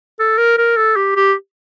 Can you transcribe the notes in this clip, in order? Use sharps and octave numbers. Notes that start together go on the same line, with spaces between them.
A4
A#4
A#4
A4
G4
G4